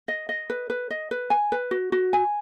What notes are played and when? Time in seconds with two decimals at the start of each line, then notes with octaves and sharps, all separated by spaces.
0.08 D#5
0.29 D#5
0.50 B4
0.70 B4
0.90 D#5
1.11 B4
1.30 G#5
1.52 B4
1.71 F#4
1.92 F#4
2.13 G#5